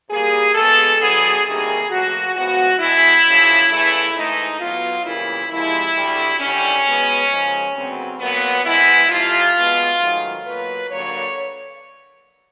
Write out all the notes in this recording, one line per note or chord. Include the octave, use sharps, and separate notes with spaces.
A#2 G3 A#3 G#4
B2 G#3 B3 A4
G2 D3 F#3 B3 G#4
D2 C3 D#3 G3 A#3 G#4
A#2 F3 A3 F#4
A2 F3 G#3 B3 F#4
E2 B2 G#3 E4
F#2 C#3 F3
E2 C#3 E3 A3 E4
G#2 E3 A3 D#4
B2 F#3 B3 F4
F2 C#3 E3 G3 A#3 E4
F2 C3 F3 G#3 E4
D2 D3 G3
D#2 D3 G3 C#4
B2 G#3 B3
D#2 C#3 F3 G#3
D2 C#3 F#3 B3 C4
A#2 F#3 A#3 B3
C3 E3 G#3 B3 E4
F2 C3 F3 F4
B2 G#3 B3
G#2 D#3 F#3 A3
B2 F#3 A#3 B4
G2 D3 F#3 A#3 C#5